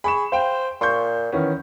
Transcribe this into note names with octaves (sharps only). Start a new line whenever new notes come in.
G#4 B5 C#6 E7
C5 F5 G5
A#2 C6 C#6 G6
D#3 E3 B3 C#4